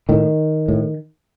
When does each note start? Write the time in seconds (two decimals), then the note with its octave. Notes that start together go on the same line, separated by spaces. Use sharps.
0.09 A2 D#3
0.68 A2